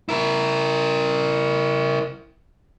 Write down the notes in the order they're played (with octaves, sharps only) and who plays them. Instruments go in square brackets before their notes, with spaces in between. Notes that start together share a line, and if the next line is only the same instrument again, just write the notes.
[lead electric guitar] E4 A#4